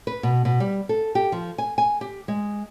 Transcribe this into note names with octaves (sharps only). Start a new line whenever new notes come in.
B4
B2
B2
G3
A4
G4
F3
G#5
G#5
G4
G#3